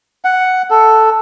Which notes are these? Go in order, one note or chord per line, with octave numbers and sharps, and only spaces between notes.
F#5
A4